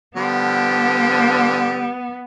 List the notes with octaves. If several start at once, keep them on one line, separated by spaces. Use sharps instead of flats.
D3 F3 G3 B3